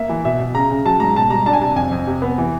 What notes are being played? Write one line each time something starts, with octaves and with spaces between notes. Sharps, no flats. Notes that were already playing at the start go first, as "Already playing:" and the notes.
Already playing: A#3 E5
E3
B2 E5
B2
C#3 A#5
C#3
F#3 A5
G#2 A#5
B2 A5
G3 A#5
D4 A5
G#5
C3 A5
F2 G#5
F2
C3
B3
E3